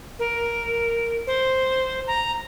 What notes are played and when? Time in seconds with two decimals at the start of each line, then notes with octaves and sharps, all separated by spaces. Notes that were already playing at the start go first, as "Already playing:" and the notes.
0.19 A#4
1.27 C5
2.07 A#5